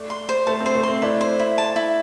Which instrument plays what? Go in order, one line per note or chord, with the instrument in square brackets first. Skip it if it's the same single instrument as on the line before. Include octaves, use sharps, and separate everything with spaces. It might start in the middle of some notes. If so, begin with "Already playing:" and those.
Already playing: [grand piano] A3 D4
[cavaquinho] C6
C5
[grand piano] A3 [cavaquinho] A5
[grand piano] C4
[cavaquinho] C5
[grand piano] A3
[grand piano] C4 [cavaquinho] C6
[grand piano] A3 D4 [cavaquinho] E4
[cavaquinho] C5
E4
A5
E4